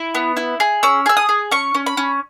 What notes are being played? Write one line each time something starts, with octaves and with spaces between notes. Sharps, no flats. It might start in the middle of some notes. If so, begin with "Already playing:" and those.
Already playing: E4
B3
E4
G#4
C#4 E6
G#4 E6
D#6
G#4
C#4 C#6
C#4
B5
C#4